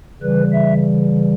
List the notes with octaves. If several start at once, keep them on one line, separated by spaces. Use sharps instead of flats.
C#3 E3 G3 B4
E5